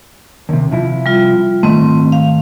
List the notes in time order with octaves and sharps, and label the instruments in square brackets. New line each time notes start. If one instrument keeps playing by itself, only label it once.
[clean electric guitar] D#2 C3
C3 F3 E4
[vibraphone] G3 F4
[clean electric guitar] G#2 D#3 A3 [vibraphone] C4
[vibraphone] F5